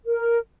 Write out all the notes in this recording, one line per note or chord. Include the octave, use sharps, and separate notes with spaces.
A#4